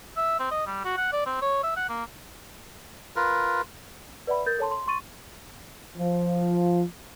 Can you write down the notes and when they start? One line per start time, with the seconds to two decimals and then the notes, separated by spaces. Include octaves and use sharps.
0.17 E5
0.40 C4
0.51 D#5
0.67 G3
0.85 F#4
0.97 F#5
1.13 D5
1.26 C4
1.42 C#5
1.63 E5
1.76 F#5
1.89 A#3
3.16 F4 A#4 B4
4.27 B4 D5 E5 F#5 B5
4.46 A#4 G6 A6
4.59 A4 C#5 A5 C6
4.71 C6
4.88 C6 C#6 A6 D#7
5.98 F3